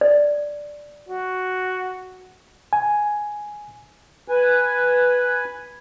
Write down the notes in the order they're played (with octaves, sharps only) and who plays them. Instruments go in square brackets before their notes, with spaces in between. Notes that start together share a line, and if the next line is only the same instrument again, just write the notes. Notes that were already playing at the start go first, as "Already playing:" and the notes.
[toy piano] D5
[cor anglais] F#4
[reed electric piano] G#5
[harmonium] B4 G#5